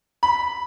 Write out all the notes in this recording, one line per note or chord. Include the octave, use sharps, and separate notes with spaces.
B5